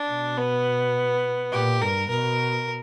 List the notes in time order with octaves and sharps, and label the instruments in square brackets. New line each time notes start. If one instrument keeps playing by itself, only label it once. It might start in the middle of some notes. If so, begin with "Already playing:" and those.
Already playing: [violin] D4
[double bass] B2
[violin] B3
[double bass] A#2 [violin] G4
[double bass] G2 [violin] A#4
[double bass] B2 [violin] A#4